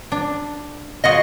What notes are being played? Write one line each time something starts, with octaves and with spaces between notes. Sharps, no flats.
D4
F4 F#4 G#4 D#5